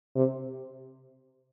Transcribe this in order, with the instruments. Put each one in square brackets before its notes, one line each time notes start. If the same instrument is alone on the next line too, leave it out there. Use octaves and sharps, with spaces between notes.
[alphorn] C3